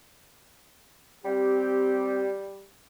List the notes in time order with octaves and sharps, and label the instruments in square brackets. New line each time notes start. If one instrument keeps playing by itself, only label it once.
[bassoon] G3 [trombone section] C4 G4